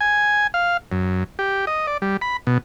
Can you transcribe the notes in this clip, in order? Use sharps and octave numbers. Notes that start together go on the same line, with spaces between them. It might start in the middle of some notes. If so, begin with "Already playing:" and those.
G#5
F5
F#2
G4
D#5
D5
G3
B5
B2